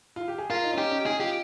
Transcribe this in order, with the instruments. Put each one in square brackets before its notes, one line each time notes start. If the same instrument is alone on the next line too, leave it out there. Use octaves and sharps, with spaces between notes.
[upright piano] F4
G4
G#4
[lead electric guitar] F4 [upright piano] A#4
[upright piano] D#4
C#4
[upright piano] D#4 [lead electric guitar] G4
[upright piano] C#4
[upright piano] D#4 [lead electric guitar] G#4
[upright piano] F4 [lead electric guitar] G4